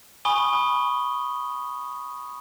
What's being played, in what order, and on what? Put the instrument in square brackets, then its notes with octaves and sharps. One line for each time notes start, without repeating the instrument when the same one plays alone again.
[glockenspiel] G#5 B5 C#6 D#6 G7